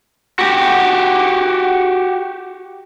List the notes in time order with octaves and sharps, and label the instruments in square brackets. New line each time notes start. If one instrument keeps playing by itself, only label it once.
[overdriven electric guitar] F#4 G4